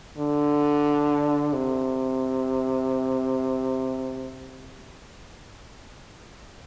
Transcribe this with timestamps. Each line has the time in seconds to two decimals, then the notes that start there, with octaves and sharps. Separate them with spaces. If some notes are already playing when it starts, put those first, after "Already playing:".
0.18 D3
1.53 C3